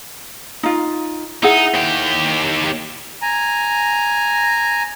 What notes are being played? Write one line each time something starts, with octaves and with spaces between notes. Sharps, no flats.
D#4 F4
D#4 E4 G#4 F#5
D#2 G4
G#5 A#5